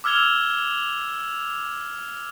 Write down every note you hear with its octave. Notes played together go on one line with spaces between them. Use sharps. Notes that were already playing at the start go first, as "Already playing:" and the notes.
D6 E6 F6 G#6 F7 G7